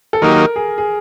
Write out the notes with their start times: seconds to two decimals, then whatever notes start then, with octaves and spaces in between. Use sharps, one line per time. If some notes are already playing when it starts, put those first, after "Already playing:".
0.13 A4
0.22 D#3 F#3 A#3 D#4 G4 A#4
0.56 G#4
0.78 G#4